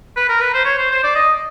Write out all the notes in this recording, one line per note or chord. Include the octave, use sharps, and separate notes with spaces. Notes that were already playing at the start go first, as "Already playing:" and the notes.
B4
A#4
B4
C5
C#5
C5
C5
D5
D#5